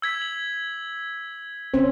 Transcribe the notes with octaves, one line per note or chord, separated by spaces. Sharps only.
E6 G#6 B6
F#7
C4 C#4 C5